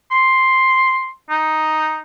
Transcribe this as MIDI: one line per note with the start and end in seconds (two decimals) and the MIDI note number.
0.12 1.12 84
1.30 1.99 63